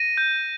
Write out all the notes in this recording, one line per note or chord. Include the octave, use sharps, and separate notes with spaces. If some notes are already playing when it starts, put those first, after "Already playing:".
Already playing: A#6 D#7
G6